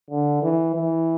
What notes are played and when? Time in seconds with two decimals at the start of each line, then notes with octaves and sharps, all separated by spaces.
0.10 D3
0.43 E3
0.75 E3